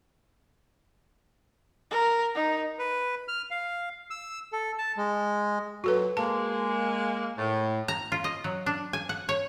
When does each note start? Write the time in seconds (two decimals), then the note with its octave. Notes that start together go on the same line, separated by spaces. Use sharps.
1.91 A#4
2.35 D#4
2.79 B4
3.28 F6
3.51 F5
4.10 E6
4.52 A4
4.78 A5
4.97 G#3
5.84 A#2 F#3 F#4 A4 B4
6.17 G#3 A#3 A5
7.38 A2
7.88 A#5
8.12 F4
8.24 D#5
8.44 F#3
8.66 D4
8.93 G#5
9.09 F#5
9.29 C#5